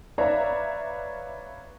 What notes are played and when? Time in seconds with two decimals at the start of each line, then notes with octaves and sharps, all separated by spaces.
0.18 B4 C#5 D5 E5 F5 A#5